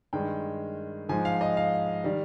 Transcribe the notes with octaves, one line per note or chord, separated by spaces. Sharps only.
G2 D#3 G#3 G5
G#2 F3 G#3 G#5
F5
D#5
F5
D#3 G3